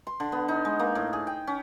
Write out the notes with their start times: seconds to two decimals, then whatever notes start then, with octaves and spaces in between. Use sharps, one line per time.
0.07 C6
0.20 D3
0.32 B3
0.48 D#4
0.65 G#3
0.79 A#3
0.95 A2
1.13 G#4
1.27 G5
1.47 C#4